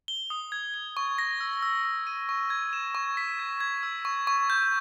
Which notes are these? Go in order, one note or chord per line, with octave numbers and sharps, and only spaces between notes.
G7
D#6
G#6
G7
C#6
A#6
E6
E6
E6
D#7
C#6
G#6
E7
C#6
B6
G#6
G#6
E6
C#6
C#6
G6